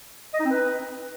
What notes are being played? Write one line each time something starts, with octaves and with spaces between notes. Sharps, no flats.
D#5
D#4
C4
B4